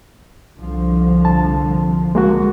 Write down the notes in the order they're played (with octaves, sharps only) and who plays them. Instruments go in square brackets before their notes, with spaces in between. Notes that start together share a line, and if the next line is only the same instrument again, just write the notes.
[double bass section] C2 D3 F3
[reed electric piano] A5
G#3 A#3 F#4